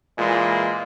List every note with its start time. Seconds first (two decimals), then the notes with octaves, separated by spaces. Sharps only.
0.18 A#2 E3 G#3